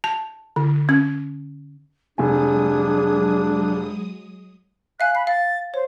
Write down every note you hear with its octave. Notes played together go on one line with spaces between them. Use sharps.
A5
D3
C#4
F1 F#3 G#3 D4 G#4 G#5 D#6
E5 F5 G#5 F#6
B5 C7
F5 A6
C5 C#5